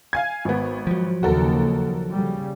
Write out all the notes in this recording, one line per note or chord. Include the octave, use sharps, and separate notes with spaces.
F5 G#5 G#6
G#1 B3
F3 F#3
D#2 C#3 F#4 A4 A#4
C#3 G3